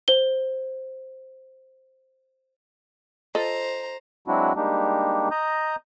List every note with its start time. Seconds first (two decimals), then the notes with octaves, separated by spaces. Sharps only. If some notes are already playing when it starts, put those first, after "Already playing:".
0.08 C5 G7
3.35 F4 A4 C5 D#5 A#5
4.28 F#3 G#3 C4 D4 E4 F#4
4.56 G3 G#3 A#3 D4 D#4 G4
5.31 D#5 A#5 D#6 G6